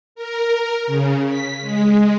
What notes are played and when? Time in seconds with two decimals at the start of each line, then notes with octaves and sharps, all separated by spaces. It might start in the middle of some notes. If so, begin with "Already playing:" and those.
0.15 A#4
0.87 C#3
1.29 B6
1.62 G#3